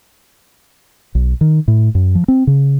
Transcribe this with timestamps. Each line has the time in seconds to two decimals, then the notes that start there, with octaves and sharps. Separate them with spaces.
1.15 B1
1.41 D#3
1.68 A2
1.95 F#2
2.15 F3
2.28 C4
2.47 C#3